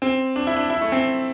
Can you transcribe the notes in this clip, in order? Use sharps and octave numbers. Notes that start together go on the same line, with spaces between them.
C4
D4
E4
D4
E4
A3
C4